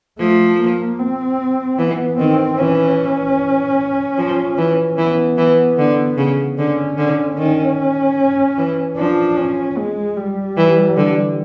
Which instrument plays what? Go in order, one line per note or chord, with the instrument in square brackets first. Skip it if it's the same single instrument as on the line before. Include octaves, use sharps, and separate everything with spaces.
[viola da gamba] F3 [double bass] A3
[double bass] A#3
C4
[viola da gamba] E3 [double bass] B3
[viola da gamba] D#3 [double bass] C4
[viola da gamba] E3 [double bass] C#4
[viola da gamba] F3
E3
[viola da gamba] E3 [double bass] B3
[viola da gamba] E3
D3
C#3
[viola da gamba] D3 [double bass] C#4
[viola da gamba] D3
[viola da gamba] D#3 [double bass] C#4
[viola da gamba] E3
[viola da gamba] F3 [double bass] D4
[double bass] C#4
G#3
G3
[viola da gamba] E3
D3